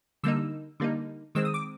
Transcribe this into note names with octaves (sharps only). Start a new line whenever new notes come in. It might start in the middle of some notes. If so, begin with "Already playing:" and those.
D3 G3 A#3 D#4 E6
D3 G3 A#3 D#4
D#3 G#3 C4 E6
D#6
D6